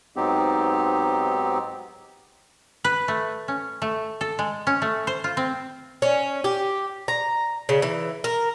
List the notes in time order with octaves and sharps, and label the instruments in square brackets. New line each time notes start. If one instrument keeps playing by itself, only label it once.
[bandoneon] G#2 F#3 B3 C4 D#4 G4
[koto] B4
A3
C#4
A3
A4
G#3
C#4
A3
C5
F4
C4
[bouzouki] C#4
G4
A#5
C#3
E3
A#4